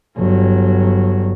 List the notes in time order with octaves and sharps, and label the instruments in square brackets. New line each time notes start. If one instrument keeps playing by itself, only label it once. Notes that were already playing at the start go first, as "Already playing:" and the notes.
[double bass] G1 F#3